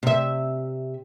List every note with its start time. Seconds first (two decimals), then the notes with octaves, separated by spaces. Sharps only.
0.03 C3 E5